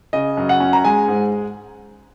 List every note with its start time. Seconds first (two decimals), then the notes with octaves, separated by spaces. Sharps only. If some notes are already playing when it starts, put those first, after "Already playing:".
0.13 C#3 D#5
0.37 F#2
0.49 F#5
0.60 C#4
0.73 A#5
0.84 G#3 G#5
1.08 G#2